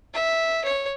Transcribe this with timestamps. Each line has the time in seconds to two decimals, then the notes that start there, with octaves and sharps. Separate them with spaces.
0.14 E5
0.64 C#5